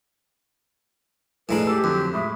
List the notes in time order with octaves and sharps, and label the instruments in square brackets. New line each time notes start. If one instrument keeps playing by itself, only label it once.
[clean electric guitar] B1 F2 D#4 [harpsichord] A2 G#3 D4 [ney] B4
[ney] G4 [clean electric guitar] A4
[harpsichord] F2 [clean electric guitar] D3 F#3
[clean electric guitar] A2 G#3 [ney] E5